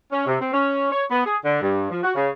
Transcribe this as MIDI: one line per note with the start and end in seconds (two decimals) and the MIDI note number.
0.12 0.26 61
0.26 0.36 48
0.40 0.48 60
0.53 0.91 61
0.91 1.03 73
1.10 1.23 59
1.26 1.37 68
1.44 1.61 50
1.61 1.88 43
1.90 2.01 53
2.02 2.12 66
2.15 2.30 49